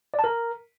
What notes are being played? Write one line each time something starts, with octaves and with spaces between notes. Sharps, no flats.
D5
A5
A#4